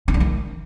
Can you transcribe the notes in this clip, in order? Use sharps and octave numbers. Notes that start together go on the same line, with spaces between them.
C#4
D4
D#3